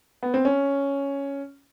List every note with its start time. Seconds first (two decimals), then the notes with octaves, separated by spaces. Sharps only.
0.23 B3
0.34 C4
0.45 C#4